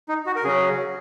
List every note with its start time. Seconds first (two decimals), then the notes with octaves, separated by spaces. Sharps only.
0.09 D#4
0.26 F#4
0.36 A#4
0.44 C#3 F#3 C#4 G#4